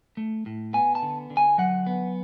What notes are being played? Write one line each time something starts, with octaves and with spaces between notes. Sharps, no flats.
A3
A2
B3 G#5
A5
D3
D3
G#5
F#3 F#5
B3